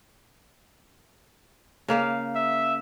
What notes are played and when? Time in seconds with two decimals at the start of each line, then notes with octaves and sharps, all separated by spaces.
1.88 C#3 A#3 F5
2.35 E5